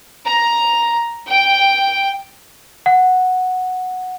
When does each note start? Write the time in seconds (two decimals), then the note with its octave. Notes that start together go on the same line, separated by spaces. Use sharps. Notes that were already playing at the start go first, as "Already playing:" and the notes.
0.26 A#5
1.27 G5
2.86 F#5